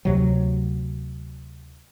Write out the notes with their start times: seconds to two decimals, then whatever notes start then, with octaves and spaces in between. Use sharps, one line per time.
0.05 D2 C3 F#3